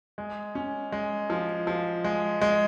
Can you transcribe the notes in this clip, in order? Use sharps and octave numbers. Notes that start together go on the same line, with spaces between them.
G#3
C#4
G#3
F3
F3
G#3
G#3